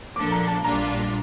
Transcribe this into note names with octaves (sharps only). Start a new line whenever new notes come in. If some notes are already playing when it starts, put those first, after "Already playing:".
A#2 F3 A#3 D4 A4 D6
A#5
A5
A#1 A#2 G3 D4 F4 A#5